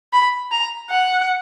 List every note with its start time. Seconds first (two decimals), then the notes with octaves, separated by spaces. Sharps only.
0.13 B5
0.52 A#5
0.90 F#5